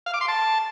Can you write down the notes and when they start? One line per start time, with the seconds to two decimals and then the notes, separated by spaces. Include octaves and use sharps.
0.06 F5
0.14 D6
0.21 C6
0.28 A5